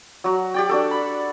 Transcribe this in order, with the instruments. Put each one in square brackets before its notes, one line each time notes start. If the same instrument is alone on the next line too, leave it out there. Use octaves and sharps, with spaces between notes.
[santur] F#3 F#4
G4 D5 G5
D4 F#4 A4
B5